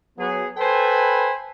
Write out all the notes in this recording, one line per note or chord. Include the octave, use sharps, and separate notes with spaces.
F#3 B3 G#4
A4 B4 C5 G5 G#5 B5